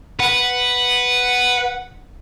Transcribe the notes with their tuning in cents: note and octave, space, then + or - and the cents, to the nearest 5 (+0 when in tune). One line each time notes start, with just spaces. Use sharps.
B4 +0 F#5 +0